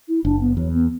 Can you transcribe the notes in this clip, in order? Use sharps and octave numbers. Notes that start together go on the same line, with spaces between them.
E4
F#1 D4
B3
E2 F#3
B3